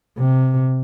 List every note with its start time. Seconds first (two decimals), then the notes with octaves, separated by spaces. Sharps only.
0.18 C3